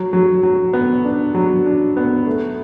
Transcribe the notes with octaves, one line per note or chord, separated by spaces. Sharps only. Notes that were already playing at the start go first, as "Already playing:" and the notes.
Already playing: F#3
F#3
F#3
B3
D4
F#3
D4
B3
A3